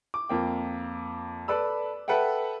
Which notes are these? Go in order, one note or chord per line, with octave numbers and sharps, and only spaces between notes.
D6
F2 A#3 G5
A4 B4 D5 B5 E6
A4 B4 E5 F#5 G5